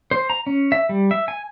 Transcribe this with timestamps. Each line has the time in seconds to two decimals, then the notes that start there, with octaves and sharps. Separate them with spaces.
0.11 C5
0.30 A#5
0.47 C#4
0.72 E5
0.89 G3
1.11 E5
1.28 G#5